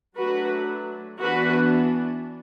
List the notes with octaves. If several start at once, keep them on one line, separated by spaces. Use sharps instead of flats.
F#3 A3 D4 F#4 B4
E3 B3 D4 F#4 B4